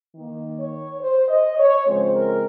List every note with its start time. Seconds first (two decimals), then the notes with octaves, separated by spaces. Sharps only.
0.14 D#3 A#3
0.57 C#5
1.00 C5
1.28 D#5
1.57 C#5
1.85 C#3 F3 G#3 C4 C5
2.13 A#4